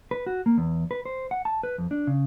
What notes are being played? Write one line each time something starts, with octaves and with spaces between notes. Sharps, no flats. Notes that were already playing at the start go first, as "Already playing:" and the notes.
B4
F#4
A#3
E2
B4
C5
F#5
A5
B4
F2
D4
C#3